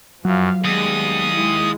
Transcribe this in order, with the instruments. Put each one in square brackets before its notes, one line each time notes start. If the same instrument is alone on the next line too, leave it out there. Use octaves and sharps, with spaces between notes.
[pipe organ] F#2 [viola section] F3 F5 [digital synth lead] F#3
[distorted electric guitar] D#2 [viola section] G3 G#3 B3 [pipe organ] D#6
[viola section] G#3 E4